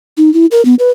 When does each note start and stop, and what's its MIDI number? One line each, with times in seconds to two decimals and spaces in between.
0.17 0.32 63
0.34 0.46 64
0.51 0.63 70
0.65 0.75 59
0.79 0.91 71